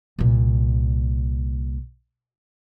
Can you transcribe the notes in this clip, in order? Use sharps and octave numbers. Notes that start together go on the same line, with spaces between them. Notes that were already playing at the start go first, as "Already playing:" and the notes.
C2 A#2